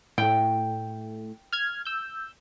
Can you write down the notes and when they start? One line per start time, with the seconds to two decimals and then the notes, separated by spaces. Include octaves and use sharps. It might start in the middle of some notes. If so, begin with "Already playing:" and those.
0.18 A2 A3 G5
1.53 F6 G#6
1.85 E6 G6